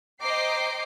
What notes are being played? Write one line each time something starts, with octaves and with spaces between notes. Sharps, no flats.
C5 D#5 G5 A#5 D6 C7